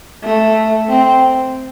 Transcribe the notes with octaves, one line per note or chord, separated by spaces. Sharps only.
A3
C4